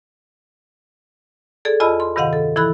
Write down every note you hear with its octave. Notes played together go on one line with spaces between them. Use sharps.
G#4 A4 D5
E2 F4 D#5 A5 B5 E6
C6
G2 C3 D#3 D#5 F5 F#5
A4
E3 E4 A4 B5 F#6